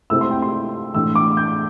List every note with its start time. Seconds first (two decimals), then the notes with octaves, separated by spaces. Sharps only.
0.10 C3 A3 C4 E4 E6
0.21 C6
0.31 G5
0.42 C6
0.94 A2 E3 A3 D4 E6
1.15 D6
1.37 G6